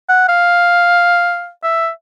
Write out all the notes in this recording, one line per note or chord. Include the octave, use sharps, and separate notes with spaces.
F#5
F5
E5